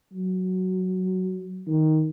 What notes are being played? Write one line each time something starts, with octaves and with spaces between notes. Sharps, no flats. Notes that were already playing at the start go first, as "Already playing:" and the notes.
F#3
D#3